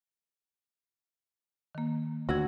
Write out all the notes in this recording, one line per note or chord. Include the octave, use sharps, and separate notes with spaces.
D#3 A#3
D2 D3 F#4 E6 G#6